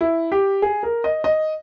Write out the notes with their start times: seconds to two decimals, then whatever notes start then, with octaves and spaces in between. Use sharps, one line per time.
0.01 E4
0.32 G4
0.62 G#4
0.83 A#4
1.04 D#5
1.24 D#5